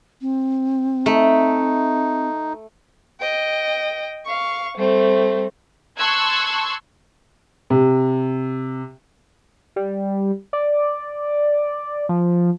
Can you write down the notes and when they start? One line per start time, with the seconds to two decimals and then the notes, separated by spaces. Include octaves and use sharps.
0.21 C4
1.06 A3 D#4
3.20 D#5 G5
4.25 F5 C#6
4.76 G3 A3 C4
5.98 A5 C6 C#6 E6 F#6 G#6
7.70 C3
9.76 G3
10.53 D5
12.09 F3